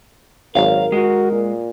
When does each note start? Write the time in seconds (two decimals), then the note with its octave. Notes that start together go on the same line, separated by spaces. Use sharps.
0.55 G#1 F#2 F#3 A#4 F5
0.92 G#3 F#4
1.32 A#2